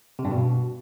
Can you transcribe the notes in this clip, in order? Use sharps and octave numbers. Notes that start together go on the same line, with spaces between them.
C3
G2
B2